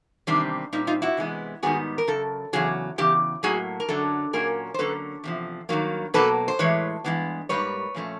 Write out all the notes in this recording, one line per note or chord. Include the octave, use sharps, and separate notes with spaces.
E2 C3 D#3 G3 C4 D4
A#2 G3 C4 D#4
D#4 F4
E4 F#4
C3 E3 G#3 B3
G#2 D#3 G3 B3 F#4 G#4
A#4
F#2 C#3 A4
E2 C#3 F#3 G#4
E2 C#3 G4
A2 F#3 A#3 F#4 G#4
A#4
F#2 D3 F#3 A4
A#2 F#3 A#3 C#4 G#4 A#4
C5
D3 F#3 A#3 C#4 A4 B4
E2 C3 F3
G2 D#3 F#3 A#3
B2 F#3 A#3 A4 B4
C5
A2 E3 G#3 B4 C#5
G2 E3 G#3 B3
G#2 D#3 G3 A#3 B4 C#5
A#2 F3 A3 C#4